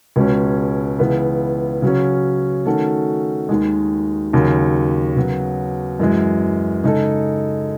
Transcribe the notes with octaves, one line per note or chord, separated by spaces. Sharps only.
C#2 B2 G#3 C#4
C#2 C#3 E3 B3 E4
C#3 F#3 C#4
D#3 A3 C#4 F#4 A4
D#2 D#3 G#3
D#2 C#3 F#3
C#3 F#3 B3 F#4
F#2 E3 G#3
C#3 G#3 D#4 A4